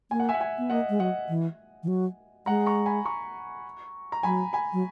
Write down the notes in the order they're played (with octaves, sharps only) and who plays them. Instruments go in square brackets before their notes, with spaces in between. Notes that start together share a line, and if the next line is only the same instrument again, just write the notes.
[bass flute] A#3 [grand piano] G#5
[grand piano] F#5
E5 G#5
F#5
E5 G#5
[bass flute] B3
[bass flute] A#3 [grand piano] D#5 F#5
[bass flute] G#3
[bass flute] F#3 [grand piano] D#5 F#5
[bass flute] E3
E3
F#3
[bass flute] G#3 [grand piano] F#5 A#5
[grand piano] A#5 C#6
G#5 B5
A#5 C#6
A#5
[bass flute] F#3 [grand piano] G#5 B5
[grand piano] G#5 B5
[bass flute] F#3